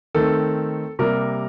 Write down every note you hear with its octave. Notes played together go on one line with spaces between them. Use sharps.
D#3 A3 C4 A4
C3 G3 A#3 A#4